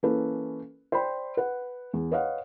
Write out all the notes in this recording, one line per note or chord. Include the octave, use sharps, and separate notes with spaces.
E3 A#3 C#4 A4 B4
C5 D5 G5 B5
B4 F#5
E2
B4 C#5 D#5 F5 F#5